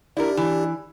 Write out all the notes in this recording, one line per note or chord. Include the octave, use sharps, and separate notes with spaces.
D4 E4 G4 A#4 D5
E3